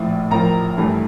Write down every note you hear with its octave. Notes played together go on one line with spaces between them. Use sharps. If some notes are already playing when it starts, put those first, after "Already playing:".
Already playing: A#1 A2 F3
A1 A2 F3 A#4 A#5
G2 E3 A3